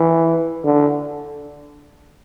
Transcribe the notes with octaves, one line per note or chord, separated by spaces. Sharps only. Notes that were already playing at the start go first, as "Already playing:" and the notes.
Already playing: E3
D3